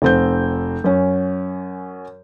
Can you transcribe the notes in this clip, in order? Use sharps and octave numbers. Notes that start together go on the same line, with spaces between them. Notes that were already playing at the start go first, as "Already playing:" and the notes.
F1 C4 G6
F#2 C#4